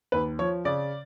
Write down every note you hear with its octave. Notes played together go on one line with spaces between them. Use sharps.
D#2 B4
F3 C#5
C#3 D5